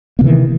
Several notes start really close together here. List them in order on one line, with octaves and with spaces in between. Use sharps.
A#3 C3 E3 D#3